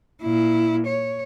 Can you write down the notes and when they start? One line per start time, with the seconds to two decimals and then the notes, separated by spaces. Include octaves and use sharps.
0.22 A#2 E4
0.87 C#5